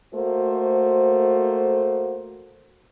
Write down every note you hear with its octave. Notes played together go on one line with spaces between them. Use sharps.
A3 A#3 F#4 C5